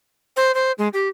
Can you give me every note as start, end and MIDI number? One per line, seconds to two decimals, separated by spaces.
0.36 0.54 72
0.54 0.72 72
0.78 0.88 56
0.93 1.08 67